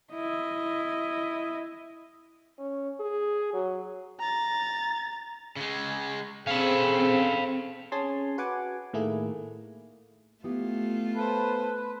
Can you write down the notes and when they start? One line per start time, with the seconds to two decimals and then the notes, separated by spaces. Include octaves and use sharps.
0.13 E4 D#5
2.59 C#4
3.00 G#4
3.54 F#3
4.20 A#5 A6
5.56 C#3 G#3
6.47 C4 C#4 G#4 A4 F5 B5
7.92 C#4 G#4 G#5 A5 C6
8.38 F#4 B4 F#5 G#5 D6
8.93 A2 D#3 A3 A#3 E4 G#4
10.44 A3 B3 E4 F4 G4
11.14 A4 B4 C5